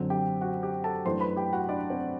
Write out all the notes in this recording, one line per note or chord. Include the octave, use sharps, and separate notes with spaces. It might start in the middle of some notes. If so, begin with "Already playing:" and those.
Already playing: F#2 D3 F#3 C4
G4 G5
F#4 F#5
G4 G5
A4 A5
F#2 E3 A3 D4 C5 C6
B4 B5
G4 G5
F#4 F#5
D4 D5
C4 C5